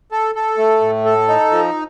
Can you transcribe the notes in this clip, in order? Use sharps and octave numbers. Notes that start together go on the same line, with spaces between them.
A4
A4
A3
A2
A4
D#4
F3